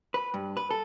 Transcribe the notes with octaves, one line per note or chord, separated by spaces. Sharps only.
B4
G2
B4
A4